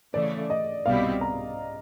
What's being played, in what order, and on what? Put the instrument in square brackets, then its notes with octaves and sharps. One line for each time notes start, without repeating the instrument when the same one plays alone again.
[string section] C#3 E3 A3 [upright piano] D5
[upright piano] D#5
[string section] C2 B2 G3 C4 E4 [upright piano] F5
[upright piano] A#5